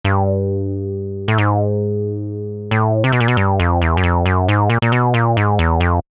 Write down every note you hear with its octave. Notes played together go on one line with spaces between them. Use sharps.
G2
A2
G#2
A2
C3
B2
A#2
B2
G2
F2
E2
F#2
F2
F#2
G#2
A#2
A#2
B2
A#2
G#2
E2
F2